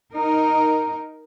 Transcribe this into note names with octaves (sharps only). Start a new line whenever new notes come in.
D#4 A#4